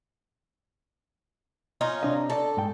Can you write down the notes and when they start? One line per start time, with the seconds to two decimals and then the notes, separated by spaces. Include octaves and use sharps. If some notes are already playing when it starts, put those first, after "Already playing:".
1.81 C#4 D#4 F4
2.03 C3 D4 D#5
2.30 A4 C#5 D5
2.57 G#2 G5